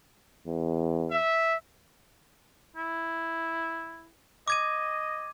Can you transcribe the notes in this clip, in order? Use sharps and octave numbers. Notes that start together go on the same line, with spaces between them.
E2
E5
E4
D#5 D6 G#6 D#7